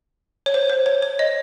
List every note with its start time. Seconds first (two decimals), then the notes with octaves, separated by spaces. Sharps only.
0.46 C#5
0.54 C5
0.70 C5
0.86 C#5
1.02 C#5
1.19 D#5